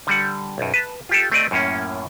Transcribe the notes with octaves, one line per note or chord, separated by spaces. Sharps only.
D3 G3 F#5
B1 F#2
B4 A5
F4 G4 A4
A3 C4 D5 D#5
F#2 A2 A#3 C#4